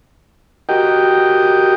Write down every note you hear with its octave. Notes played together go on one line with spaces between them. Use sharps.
F#4 G4 A#4 D#5 G5